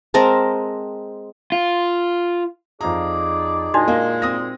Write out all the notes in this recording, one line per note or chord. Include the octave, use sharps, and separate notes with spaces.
G#3 C4 A#4 A5
F4
F2 D#4 G#4 D5 F5 A#5
A#2 G#3 D4 D#4 F#4 D#5
A#3 D#5
C4 D#6 A#6